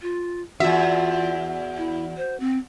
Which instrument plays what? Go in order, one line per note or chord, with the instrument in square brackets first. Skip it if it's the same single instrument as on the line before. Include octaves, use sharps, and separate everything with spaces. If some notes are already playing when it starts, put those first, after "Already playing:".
[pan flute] F4
[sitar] E2 E5 [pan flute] F4 [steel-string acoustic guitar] F#4
[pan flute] E4
C5
C4